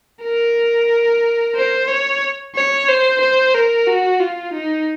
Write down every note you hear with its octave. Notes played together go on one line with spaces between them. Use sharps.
A#4
C5
C#5
C#5
C5
C5
A#4
F#4
F4
D#4